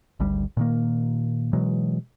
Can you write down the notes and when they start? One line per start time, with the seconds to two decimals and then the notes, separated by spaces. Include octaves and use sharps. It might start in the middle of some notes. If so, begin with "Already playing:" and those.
0.20 G#1 D2 G3
0.57 A#2 D#3 A#3
1.53 B2 E3 F#3 G#3